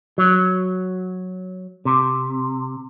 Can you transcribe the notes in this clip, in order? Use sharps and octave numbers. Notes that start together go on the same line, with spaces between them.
F#3
C3